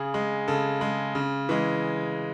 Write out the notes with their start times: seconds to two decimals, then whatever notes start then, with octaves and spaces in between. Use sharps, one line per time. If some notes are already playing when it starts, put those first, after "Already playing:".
Already playing: C#3 G#4
0.14 G#3
0.48 C#3 A4
0.81 G#3
1.15 C#3
1.49 E3 G#3